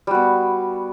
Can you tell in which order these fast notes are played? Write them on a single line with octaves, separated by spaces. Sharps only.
G3 F#4 B3